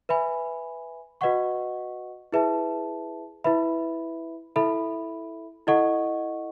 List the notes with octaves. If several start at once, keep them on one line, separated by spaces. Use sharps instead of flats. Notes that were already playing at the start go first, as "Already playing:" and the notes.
B4 E5 G#5 B5
F#4 B4 D#5 F#5 C#6
E4 G#4 B4 E5 A5
E4 B4 E5 B5
E4 A4 E5 B5
E4 A4 D#5 F#5 C#6